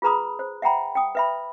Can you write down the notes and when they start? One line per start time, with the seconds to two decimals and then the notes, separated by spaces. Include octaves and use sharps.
0.02 F4 G#4 B4 A#5 B5 D#6
0.39 C5
0.62 E5 F#5 G5 A#5 B5
0.95 G5 D#6
1.15 B4 E5 B5